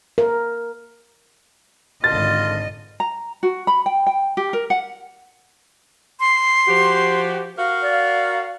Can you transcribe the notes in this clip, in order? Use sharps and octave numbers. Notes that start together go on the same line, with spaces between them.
A#4
G#1 D3 F4 D#5 A6
A#5
F#4
B5
G5
G5
G4
A#4
F#5
C6
F3 F#4 G4
F#4 A#4 F5
D5